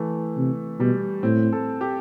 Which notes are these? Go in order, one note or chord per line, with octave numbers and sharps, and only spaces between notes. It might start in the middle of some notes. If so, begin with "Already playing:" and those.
Already playing: E3 A3
C3
B2 G3
A2 C4
A4
G4